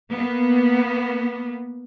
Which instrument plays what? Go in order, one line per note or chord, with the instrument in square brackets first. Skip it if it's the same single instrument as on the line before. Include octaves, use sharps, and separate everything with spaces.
[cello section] A#3 B3